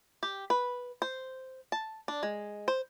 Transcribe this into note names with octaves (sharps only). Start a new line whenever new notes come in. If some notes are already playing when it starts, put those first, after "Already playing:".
G4
B4
C5
A5
D4
G#3
C5